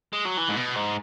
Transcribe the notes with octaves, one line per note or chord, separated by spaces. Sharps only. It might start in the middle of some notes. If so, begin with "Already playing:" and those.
G#3
F#3
E3
G#2
B2
G#2